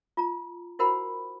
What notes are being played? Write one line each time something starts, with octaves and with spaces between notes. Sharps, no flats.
F4 A#5
E4 F#4 A#4 C5 F#5 B5